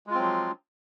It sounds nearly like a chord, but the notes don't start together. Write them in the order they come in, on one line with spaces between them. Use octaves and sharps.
G#3 F4 C4 F#3 F3